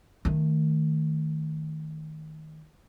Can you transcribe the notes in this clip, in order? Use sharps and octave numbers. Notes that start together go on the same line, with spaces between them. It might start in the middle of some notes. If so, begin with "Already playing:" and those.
D#3 A3